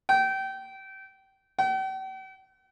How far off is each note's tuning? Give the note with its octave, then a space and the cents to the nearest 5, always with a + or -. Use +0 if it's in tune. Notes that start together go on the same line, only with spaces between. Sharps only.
G5 -25
G5 -45